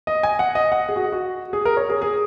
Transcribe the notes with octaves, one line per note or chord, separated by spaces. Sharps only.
D#5
G#5
F#5
D#5
F#5
G#4
F#4
F#4
G#4
A#4
C#5
G#4
G#4